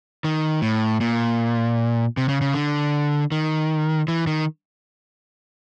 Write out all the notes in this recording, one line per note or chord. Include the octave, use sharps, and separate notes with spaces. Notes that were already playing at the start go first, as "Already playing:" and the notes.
D#3
A2
A#2
C3
C#3
C#3
D3
D#3
E3
D#3